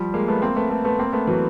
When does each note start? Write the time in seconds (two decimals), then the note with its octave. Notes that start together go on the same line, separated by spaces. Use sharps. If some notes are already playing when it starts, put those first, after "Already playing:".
Already playing: F3 G3
0.14 G#3 A#3
0.28 A3 B3
0.42 A#3 C4
0.56 A3 B3
0.70 A3 B3
0.84 A3 B3
0.99 A#3 C4
1.12 A3 B3
1.27 E3 F#3